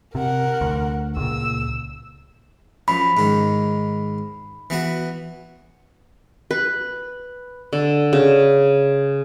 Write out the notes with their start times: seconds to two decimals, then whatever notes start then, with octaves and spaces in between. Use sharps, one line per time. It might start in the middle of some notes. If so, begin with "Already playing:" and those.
0.15 C3 A#4 F#5
0.61 D2
1.17 C#2 A#2 E6
2.88 F#2 F3 B5
3.17 G#2 D#3
4.70 E3 B3 F#4
6.51 B4
7.73 D3
8.13 C#3